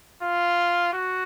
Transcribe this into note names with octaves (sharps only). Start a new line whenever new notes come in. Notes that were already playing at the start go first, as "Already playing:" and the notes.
F4
F#4